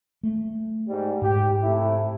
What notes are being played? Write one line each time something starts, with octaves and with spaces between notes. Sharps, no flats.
A3
G#2 G3
G#2 G4
C3 A3 E4